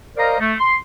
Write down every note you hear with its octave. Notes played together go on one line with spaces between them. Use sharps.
A#4 C5 D5 D#5 F5 A#5
A3
C6